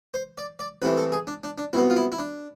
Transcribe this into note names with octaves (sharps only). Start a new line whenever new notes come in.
C5
D5
D5
C2 C3 E3 A3 B4
A4
G#4
D4
D4
D4
C2 B2 B3 E4
F4
E4
E4
D4